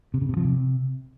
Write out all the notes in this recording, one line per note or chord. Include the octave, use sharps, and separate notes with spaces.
C3
C#3
C3
F3
C3